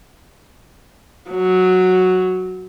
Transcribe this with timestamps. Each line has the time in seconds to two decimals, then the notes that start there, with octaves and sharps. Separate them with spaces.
1.30 F#3